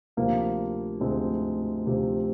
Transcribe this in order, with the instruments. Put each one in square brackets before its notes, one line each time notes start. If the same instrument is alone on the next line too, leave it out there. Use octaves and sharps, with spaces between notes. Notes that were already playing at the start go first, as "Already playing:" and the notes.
[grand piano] D2 C3 F3 A#3
D2 C3 F3 G#3 C4
D2 C3 F3